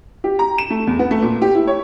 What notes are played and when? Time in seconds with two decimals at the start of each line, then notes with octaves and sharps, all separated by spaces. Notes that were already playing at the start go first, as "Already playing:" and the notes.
0.24 G4
0.39 A#5
0.58 E7
0.70 A3
0.87 E2
0.99 B3
1.11 A3
1.22 A#2
1.42 G4
1.55 E4
1.67 C#5